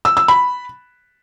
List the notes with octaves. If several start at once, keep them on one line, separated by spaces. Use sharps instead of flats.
E6
E6
B5